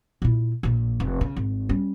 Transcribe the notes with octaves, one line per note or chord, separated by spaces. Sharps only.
A#2 E4
A#1 A#2
F1
C#3
G#1
G3 C#4